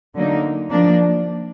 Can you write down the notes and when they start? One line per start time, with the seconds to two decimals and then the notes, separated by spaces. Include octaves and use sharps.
0.15 D3 F#3 A#3 D#4
0.71 F3 A#3 D4